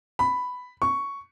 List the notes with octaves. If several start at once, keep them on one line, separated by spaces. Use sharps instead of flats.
B5
C#6